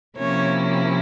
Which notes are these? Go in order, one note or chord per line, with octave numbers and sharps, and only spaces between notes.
C3 F3 A#3 C#4 E4 C#5